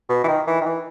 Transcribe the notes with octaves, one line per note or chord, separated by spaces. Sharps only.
B2
E3
D#3
E3
D#3
E3